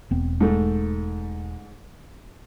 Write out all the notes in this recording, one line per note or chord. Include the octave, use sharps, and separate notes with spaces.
E1 B3 C4
G#2 A3